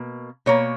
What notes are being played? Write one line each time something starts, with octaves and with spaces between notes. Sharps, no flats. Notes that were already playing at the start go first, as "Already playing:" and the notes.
Already playing: B2 A#3
B2 A#3 C#5